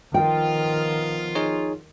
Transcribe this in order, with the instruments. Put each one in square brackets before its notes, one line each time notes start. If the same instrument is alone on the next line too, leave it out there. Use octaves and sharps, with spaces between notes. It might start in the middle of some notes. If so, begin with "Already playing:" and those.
[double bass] D#3 [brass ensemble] F3 B3 F4 [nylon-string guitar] G5
[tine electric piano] D#4 G#4 C#5